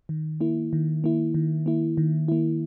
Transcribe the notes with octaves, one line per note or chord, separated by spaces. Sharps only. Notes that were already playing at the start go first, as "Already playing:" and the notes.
D#3
A#3 E4
D#3
A#3 E4
D#3
A#3 E4
D#3
A#3 E4